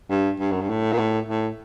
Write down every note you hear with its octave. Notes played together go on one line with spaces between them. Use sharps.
G2
G2
F#2
G2
A2
A#2
A2
A2